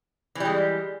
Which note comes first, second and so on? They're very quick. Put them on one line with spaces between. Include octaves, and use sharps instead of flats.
E3 G3 G#3